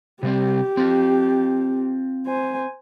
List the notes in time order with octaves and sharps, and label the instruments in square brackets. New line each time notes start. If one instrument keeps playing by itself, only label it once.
[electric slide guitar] C3 G3 C4 [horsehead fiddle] G4
[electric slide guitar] C4 F4
[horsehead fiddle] C5 G#5